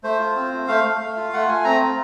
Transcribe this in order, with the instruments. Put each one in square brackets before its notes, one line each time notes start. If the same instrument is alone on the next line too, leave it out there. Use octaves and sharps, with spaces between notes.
[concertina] A3 C5
F4
C4
A3
A3 F5
A3
A3
F4
A3 F#5
A3 G#5
C4 A#5
F4